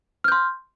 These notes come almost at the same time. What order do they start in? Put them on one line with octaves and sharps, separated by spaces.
F6 G6 C6